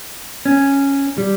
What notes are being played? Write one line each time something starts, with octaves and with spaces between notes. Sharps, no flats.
C#4
G3